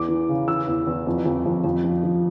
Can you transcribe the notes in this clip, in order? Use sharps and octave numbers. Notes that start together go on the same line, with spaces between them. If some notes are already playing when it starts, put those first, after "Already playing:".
Already playing: E2 D6
E3
C#3
E3 E6
E2
E2
F2
F2
F2
F2
F3
F3